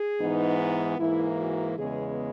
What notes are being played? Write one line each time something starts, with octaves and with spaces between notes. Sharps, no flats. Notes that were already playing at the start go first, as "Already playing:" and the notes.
Already playing: G#4
G#2 E3 B3 D#4
D#4
G#2 E3 A#3 E4
F#4
E2 C#3 G#3 B3 G#4